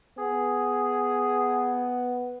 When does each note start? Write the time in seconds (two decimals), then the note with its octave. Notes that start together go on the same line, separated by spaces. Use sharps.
0.18 B3 G#4